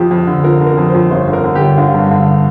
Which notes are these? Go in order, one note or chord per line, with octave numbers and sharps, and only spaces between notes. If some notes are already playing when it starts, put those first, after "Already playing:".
Already playing: F2 F3 G4
F2
D3
F3 A#4
D3
A#4
F2
C5
F2
G1 C5
D3
A#4
D3
G4
G1
D3 F4
G2
D3